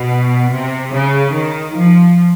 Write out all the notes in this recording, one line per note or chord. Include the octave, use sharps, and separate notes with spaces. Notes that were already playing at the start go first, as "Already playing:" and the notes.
Already playing: B2
C3
C#3
D#3
F3